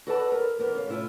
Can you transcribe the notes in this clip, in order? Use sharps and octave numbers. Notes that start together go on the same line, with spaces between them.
F#4 A4 B4 D5 D#5 A5
A#4
E2 B3 A#4
C#4 F5
A2 C3 E4 F4